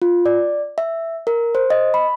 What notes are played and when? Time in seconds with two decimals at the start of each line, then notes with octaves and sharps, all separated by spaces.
0.02 F4
0.26 D5
0.78 E5
1.27 A#4
1.55 C5
1.70 D#5
1.94 B5